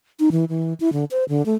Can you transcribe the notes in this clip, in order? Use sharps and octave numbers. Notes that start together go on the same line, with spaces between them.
D#4
E3
E3
E4
D3
C5
D3
A3